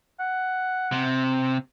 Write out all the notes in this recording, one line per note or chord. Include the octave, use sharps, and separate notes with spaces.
F#5
C3